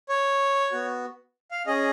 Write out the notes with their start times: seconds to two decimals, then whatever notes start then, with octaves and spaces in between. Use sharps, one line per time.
0.09 C#5
0.72 B3 F#4
1.51 F5
1.67 C#4 G#4 D#5